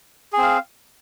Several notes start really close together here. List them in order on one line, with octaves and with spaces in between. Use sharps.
G#4 C4 F5